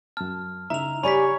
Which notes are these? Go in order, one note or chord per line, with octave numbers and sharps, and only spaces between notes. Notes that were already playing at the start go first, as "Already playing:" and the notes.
F#2 A5 F6
C#3 D#4 E4 E5 A#5 F7
G4 C#5 D5 G#5 B5 B6